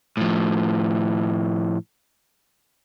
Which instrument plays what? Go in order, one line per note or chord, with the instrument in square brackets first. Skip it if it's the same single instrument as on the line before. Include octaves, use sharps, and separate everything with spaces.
[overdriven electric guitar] A2 F3